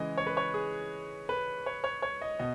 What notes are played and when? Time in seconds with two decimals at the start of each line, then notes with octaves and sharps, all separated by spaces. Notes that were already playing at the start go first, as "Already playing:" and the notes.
Already playing: C#3 E3 G#3 D#5
0.18 C#5
0.27 B4
0.37 C#5
0.54 G#4
1.29 B4
1.66 C#5
1.84 C#5
2.02 C#5
2.22 D#5
2.39 B2 D#5